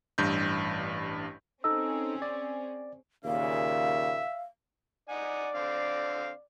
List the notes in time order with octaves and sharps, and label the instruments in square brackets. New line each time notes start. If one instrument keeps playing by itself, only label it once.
[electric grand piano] A1 G2 G6
[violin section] C4 C#4 G#4 [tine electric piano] D#4 A4 D#5 [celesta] E6
[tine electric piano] D5
[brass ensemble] D#2 A#2 C#3 [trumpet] E5 [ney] F5
[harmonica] D#4 F#5 G#5 [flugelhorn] D5
[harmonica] D3 C4 F5